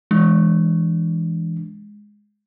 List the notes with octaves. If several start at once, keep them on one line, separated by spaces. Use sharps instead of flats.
E3 G#3 D4